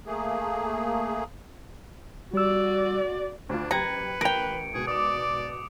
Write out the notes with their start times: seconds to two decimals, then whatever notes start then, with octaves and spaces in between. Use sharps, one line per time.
0.07 A3 A#3 G#4
2.34 G3 F#4 D5 E6
3.49 D2 D4 F4
3.71 F#1 G4 B4 A#5 G#6 C#7
4.21 A1 A#4 G5 D7 F7
4.74 G#2 B2 G#4
4.87 D5 D6 D#6